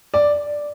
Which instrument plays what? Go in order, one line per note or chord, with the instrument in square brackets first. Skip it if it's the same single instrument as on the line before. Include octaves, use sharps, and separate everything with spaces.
[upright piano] D5